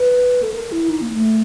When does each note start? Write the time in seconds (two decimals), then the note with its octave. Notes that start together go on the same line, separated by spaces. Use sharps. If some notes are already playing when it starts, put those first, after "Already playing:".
Already playing: B4
0.43 A4
0.54 A#4
0.72 E4
0.89 D#4
1.02 A#3
1.13 A3